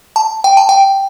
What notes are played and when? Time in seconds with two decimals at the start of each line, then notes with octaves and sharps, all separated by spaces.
0.16 A5
0.44 G5
0.57 A5
0.69 G5